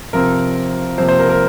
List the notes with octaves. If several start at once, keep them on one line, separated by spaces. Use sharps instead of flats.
C3 F3 C4 A#4
C3 F3 A#3 C5
C5
A#4
A#4